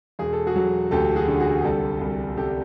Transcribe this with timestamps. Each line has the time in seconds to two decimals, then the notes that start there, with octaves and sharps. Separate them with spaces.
0.19 E1 G#4
0.33 A4
0.47 F#4 G#4
0.56 F#3
0.91 D2 G4 A4
1.16 F#4 G#4
1.28 D3
1.40 F#4 G#4
1.58 G#4
1.64 C2 G4 A4
2.01 C2
2.36 C3 G4 A4